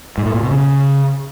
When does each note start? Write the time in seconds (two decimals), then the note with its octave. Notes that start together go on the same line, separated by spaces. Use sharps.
0.18 G#2
0.26 A2
0.34 A#2
0.43 B2
0.51 C#3